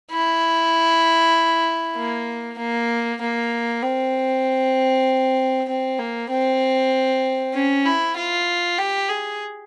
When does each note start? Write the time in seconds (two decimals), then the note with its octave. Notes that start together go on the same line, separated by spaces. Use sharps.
0.11 E4
1.96 A#3
2.59 A#3
3.21 A#3
3.83 C4
5.69 C4
5.99 A#3
6.30 C4
7.54 C#4
7.85 E4
8.17 F4
8.78 G4
9.09 G#4